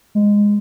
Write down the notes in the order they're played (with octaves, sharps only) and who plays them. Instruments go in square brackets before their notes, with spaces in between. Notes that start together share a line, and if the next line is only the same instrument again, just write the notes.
[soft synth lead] G#3